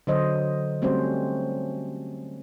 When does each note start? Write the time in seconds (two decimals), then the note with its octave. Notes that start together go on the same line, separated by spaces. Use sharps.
0.07 D3 F#3 C5 D#5
0.82 G3 A3 C4 C#4 F#4 C5